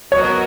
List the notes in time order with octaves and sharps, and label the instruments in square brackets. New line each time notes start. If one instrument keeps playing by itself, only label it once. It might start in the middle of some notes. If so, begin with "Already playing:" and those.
[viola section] F#3 B3 F#4 A#4 D#5 [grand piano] C#5